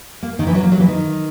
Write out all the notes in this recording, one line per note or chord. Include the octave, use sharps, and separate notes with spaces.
A#3
D#3
E3
F#3
A#3
F#3
E3
D#3